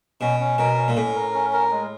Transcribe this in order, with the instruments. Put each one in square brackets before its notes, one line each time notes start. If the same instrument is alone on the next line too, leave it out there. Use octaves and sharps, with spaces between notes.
[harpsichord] B2 [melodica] C#4
[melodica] C#4
[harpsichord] B2 [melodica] A#4
[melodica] C#4
[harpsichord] A#2
[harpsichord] A2 [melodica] C#4
[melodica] A#4
C#4
A#4
G#3